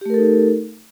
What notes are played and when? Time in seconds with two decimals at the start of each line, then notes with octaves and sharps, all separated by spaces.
0.01 G4
0.06 A3
0.10 A#4
0.14 A4
0.18 D#4